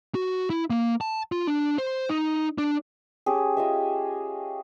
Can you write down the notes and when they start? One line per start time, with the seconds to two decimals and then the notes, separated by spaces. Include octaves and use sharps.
0.15 F#4
0.50 E4
0.70 A#3
1.01 A5
1.32 F4
1.47 D4
1.78 C5
2.09 D#4
2.58 D4
3.26 C#4 G4 G#4
3.57 F4 D#5 E5